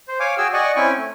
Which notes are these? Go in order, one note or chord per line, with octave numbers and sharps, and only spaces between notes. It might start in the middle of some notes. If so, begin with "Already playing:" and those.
C5
C#5 F5 G#5 D6
F#4 G#4 G5 G#5 E6
D5 D#5 F#5 G#5 C#6
C4 C#4 E4 G5 G#5 C#6
A3